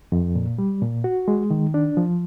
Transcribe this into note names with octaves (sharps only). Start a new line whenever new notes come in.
F2
A#2
G3
A#2
F#4
G#3
D#3
D4
F3